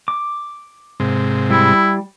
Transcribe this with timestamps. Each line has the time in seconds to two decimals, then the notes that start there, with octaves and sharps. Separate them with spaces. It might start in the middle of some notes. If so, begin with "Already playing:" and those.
0.08 D6
1.00 G#2 C3
1.50 G3 E4